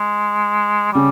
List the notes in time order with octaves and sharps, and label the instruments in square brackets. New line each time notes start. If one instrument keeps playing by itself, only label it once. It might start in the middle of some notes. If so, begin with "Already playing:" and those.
Already playing: [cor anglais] G#3
[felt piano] C#3 [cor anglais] G3